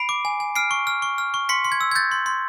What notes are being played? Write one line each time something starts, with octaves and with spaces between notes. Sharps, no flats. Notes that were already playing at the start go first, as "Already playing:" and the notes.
Already playing: B5 C7 D7
D6
G#5
G#5
F6 C7 D7
C#6
F6
C#6
F6
C#6
C6 B6 C#7
C6
G#6
E6
G#6
G6 A6
C6
C6